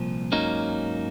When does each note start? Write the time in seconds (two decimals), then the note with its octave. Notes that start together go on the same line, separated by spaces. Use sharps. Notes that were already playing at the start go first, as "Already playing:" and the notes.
Already playing: C2 A#2 F3
0.32 G#2 F#3 A#3 C#4 D#4